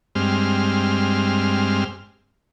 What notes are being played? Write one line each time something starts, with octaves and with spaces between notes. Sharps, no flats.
G2 G#3 C4 F6